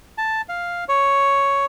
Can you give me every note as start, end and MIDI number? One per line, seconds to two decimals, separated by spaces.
0.18 0.42 81
0.49 0.84 77
0.89 1.66 73